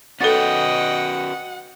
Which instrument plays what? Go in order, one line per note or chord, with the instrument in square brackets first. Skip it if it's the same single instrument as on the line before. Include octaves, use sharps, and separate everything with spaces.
[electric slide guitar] C#4 F#4 B4 [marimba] A4 A6 [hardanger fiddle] D#5 G5 [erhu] F#5